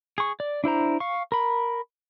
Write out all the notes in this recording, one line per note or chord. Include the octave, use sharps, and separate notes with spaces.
G#4 C#6
D5
D4 E4 C5 A#5
F5 C#6
A#4 B5